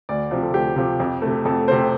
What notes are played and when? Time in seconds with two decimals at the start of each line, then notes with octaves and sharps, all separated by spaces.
0.09 D2 D5
0.31 C3 F3
0.43 A4
0.54 D2 G4
0.76 C3 F3
1.00 F2
1.22 C3 A3
1.45 F2 A4
1.68 C3 A3 C5